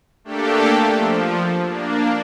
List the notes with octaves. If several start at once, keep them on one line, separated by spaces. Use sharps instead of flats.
A3 A#3 D4 G4 A4
F3
A#3 D4